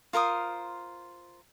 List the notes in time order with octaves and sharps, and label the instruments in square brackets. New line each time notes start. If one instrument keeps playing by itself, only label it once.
[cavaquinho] F4 A#4 C5 D#6